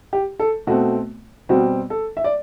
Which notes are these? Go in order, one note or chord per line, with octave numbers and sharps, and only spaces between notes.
G4
A4
B2 A3 C4 F#4
B2 G3 C4 F#4
A4
E5
D5